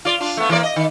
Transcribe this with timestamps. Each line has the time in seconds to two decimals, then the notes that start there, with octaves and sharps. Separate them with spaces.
0.05 F4 D5
0.20 D4 F4
0.37 A3 B3
0.49 E3 A#3 D5
0.63 D#5
0.76 D#3